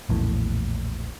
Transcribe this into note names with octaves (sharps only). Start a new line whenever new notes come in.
A#1 E2 A2